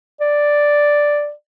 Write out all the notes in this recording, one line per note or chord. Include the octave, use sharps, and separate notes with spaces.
D5